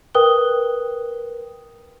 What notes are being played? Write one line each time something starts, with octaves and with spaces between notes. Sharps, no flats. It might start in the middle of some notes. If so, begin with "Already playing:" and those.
A#4 B4 G5 D#6 F#6 G7